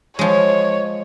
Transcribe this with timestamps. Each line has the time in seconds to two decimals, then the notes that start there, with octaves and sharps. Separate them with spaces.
0.19 F3 G#3 C#5